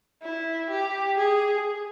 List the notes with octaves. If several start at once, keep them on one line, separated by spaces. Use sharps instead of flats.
E4
G4
G#4